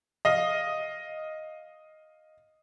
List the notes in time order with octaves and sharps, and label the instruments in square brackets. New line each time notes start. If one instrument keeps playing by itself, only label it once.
[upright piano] D#5 F5